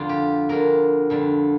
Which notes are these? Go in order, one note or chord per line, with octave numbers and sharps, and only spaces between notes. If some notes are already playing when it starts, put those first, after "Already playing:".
Already playing: F2 D3 G3 F4
G4
F2 D3 G3 A#4
F2 D3 G3